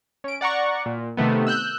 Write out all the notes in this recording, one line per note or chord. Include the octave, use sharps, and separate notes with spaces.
C#4 D7
D5 F#5 A#5 C#6
A#2
C3 D#3 A3 B3
E6 F#6 G6